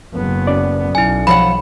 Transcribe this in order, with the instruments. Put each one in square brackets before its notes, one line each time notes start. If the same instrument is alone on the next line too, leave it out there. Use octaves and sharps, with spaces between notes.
[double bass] F#1 B3
[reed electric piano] F#3 C#4 D5
[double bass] B1 [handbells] E4 G#5
[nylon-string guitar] F3 C#5 F#5 [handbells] B5